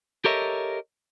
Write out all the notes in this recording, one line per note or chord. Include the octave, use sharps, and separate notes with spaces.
G4 A4 A#4 C#5 D#5 E5